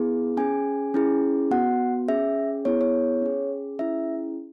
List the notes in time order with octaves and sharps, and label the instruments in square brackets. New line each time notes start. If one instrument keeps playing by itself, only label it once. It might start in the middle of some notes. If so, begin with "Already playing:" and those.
Already playing: [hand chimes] B3 E4 G#4
C#4 G#4 G#5
C#4 E4 G#4
B3 F#4 F#5
C#4 G#4 E5
B3 E4 G#4 C#5
C#5
C#4 G#4
C#4 E4 G#4 E5